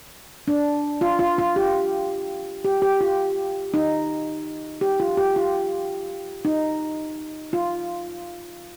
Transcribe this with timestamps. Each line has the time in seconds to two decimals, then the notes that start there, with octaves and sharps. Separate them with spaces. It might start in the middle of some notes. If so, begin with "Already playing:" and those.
0.48 D4
1.01 F4
1.19 F4
1.38 F4
1.56 G4
2.65 G4
2.82 G4
3.01 F4
3.74 D#4
4.81 G4
5.00 F4
5.17 G4
5.36 F4
6.45 D#4
7.53 F4